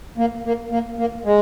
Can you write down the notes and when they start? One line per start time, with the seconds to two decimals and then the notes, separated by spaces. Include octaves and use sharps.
0.18 A#3
0.45 A#3
0.71 A#3
0.98 A#3
1.25 G#3